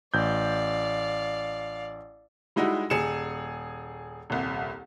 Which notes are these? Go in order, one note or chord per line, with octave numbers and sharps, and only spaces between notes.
A1 D5 F5 G6
G3 G#3 D#4 E4 F#4
D#1 G#4 C#7 E7
D#1 C2